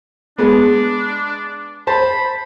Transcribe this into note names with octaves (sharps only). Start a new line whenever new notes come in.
G#3 B3 D4
C5 A5 B5